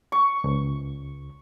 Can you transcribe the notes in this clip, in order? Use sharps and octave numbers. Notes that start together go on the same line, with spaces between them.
C#6
C#2